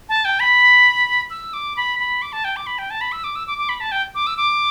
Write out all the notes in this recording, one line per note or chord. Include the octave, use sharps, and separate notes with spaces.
A5
G5
B5
E6
D6
B5
B5
D6
A5
G5
D6
B5
G5
A5
B5
E6
D6
E6
D6
D6
B5
A5
G5
D6
E6
D6